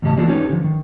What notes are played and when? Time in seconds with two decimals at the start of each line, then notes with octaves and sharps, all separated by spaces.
0.02 E2 A2 C#3 G4 D#5 A5
0.17 E3 A#3 D4 F4 F#4 A4
0.28 C#4 D#4 G4 A4 B4 C#5
0.50 D3 F3
0.64 D#3